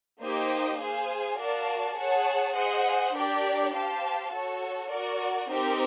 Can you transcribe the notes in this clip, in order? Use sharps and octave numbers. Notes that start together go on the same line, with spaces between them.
A#3 D#4 G4 C5 D#5
G#4 C5 F5 G#5
F#4 A#4 D5 F5 A5
G#4 C#5 F#5 A5
G#4 C5 D#5 F#5
D4 G4 A#4 D5
G4 C5 F5 A5
F#4 A4 C#5
F#4 A#4 D5
C4 D#4 G4 A#4